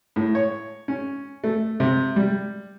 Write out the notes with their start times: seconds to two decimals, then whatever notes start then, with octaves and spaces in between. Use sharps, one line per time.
0.16 A2
0.35 C#5
0.88 C#4
1.44 A3
1.80 C3
2.16 G3